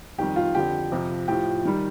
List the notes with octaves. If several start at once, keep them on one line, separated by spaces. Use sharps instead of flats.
F2 D#3 G3 G4
F4
F2 D3 F3 G4
F2 C3 F3
A2 F3 G4
D#3 G3